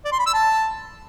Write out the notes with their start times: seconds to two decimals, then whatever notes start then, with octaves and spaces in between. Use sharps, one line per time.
0.05 D5
0.12 C6
0.19 B5
0.27 E6
0.34 A5